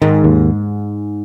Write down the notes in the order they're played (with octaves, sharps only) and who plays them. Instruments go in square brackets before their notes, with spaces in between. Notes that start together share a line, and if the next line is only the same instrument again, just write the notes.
[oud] G#2 [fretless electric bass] D#3
[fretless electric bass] D#2